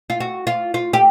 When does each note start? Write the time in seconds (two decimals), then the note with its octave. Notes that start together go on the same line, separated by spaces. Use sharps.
0.10 F4
0.20 F#4
0.47 F4
0.74 F4
0.93 G4